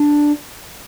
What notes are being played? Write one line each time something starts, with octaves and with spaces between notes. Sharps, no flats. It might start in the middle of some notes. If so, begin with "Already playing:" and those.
Already playing: D4